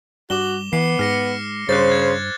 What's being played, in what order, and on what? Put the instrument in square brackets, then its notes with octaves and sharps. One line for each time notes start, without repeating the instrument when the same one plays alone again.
[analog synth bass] G2 [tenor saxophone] F#4 [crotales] D6 E7 G7
[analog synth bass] E3 [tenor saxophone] B3 [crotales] C7
[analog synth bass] G#2 [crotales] F6 A#6 C#7
[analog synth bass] G2 [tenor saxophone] C#3 [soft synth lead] C5 [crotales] F#6 A6
[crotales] G#6